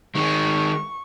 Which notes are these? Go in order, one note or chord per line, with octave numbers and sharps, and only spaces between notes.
D#3 G#3 C#6